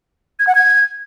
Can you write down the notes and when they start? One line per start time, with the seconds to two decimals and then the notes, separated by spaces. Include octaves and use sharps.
0.39 G#6
0.47 F#5
0.55 G#6